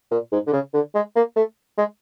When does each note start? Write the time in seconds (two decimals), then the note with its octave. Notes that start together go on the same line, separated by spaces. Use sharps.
0.11 A#2
0.32 G#2
0.47 D3
0.53 C#3
0.74 D3
0.95 G#3
1.16 A#3
1.36 A3
1.78 G#3